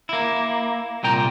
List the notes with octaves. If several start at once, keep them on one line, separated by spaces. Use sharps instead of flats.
A#3 E4
C2 A#2 G5 A#5